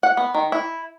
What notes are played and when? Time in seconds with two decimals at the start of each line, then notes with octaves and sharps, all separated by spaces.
0.03 F#5
0.17 B3
0.34 D#3
0.52 E4